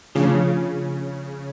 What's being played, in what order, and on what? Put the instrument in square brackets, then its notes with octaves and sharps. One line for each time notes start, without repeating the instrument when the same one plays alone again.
[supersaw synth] C#3 [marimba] F3 A3 D4 F4